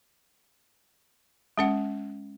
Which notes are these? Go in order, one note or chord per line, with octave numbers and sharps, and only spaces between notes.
G#3 C#4 F#5